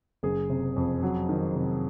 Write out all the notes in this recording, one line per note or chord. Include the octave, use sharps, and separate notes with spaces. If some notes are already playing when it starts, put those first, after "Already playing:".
F#1 G#4
C3
F2
F#3
D#3
C3